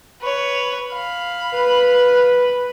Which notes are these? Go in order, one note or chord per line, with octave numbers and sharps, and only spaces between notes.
B4 C#5
F5 B5
B4